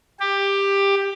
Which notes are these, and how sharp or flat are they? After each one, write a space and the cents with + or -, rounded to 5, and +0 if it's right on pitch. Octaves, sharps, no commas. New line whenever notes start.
G4 +15